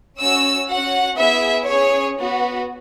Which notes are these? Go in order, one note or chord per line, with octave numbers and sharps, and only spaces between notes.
C#4 F#4 E6
C#4 F#4 F#5
B3 E4 G#4 E5
C#4 G#4 C#5
B3 F#4